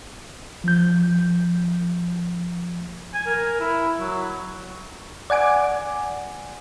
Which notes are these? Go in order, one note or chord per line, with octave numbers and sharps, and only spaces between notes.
F3 G6
G#5
A#4
E4
F#3
D5 F#5 G#5 D6